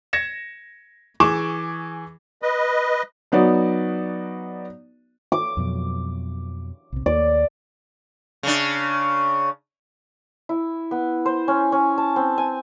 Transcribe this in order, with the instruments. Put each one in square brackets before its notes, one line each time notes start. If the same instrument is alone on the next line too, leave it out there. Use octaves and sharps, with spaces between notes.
[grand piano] G#6 A#6 C#7 E7
E3 G#4 C#6 D6 E7
[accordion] B4 D#5
[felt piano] F#3 B3 D#4 F#4 D5
[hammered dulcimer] D6
[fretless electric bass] F2 B2 F#3
B1 C3
[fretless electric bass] D#2 A#3 [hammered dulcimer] D5
[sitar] C#3 D4
[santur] E4
B3
C5
C#4
C#4
A5
C4
G#5